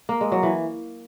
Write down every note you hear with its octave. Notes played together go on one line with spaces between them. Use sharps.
A#3
G#3
F#3
E3